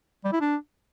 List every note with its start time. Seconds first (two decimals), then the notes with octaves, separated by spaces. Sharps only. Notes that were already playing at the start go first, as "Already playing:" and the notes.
0.24 G3
0.33 E4
0.41 D4